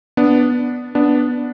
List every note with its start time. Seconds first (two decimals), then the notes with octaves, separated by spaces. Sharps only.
0.17 B3 D4
0.95 B3 D4